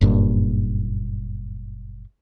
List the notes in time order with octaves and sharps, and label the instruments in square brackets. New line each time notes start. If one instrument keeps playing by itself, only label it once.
[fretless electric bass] F#1 G2 A#2